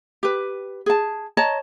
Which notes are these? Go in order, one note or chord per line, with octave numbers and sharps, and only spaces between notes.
G4 B4
G#4 A5
C#5 D#5 A5 A#5